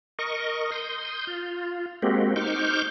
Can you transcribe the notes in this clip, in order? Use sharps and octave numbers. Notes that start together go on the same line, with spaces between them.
A#4 D#5 C#6
C6 D#6 G6
F4
G#3 A#3 C4 F#4 G4
D#4 C5 C#6 D6 F6 G6